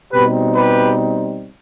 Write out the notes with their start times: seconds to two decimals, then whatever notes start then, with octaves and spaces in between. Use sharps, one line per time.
0.12 B2 G3 C4 D#4 G4 B4
0.55 G4 B4